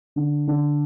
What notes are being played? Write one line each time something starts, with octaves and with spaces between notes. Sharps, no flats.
D3
D3